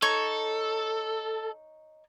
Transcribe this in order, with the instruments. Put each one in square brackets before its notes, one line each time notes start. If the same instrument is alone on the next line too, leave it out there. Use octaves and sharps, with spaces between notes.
[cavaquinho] D#4 C#5 C#6 [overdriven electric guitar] A4